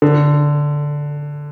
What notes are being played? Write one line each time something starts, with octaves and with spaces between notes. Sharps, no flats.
D3